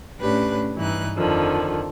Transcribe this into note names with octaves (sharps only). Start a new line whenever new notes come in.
A2 C#4 D4 G4 B4 F#6
G2 E3 D#4 F#6
F2 D3 D#3 F3